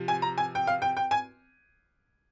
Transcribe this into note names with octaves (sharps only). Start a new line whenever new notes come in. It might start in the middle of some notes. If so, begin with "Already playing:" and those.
Already playing: C3 F3
G#5
A#5
G#5
G5
F5
G5
G5
G#5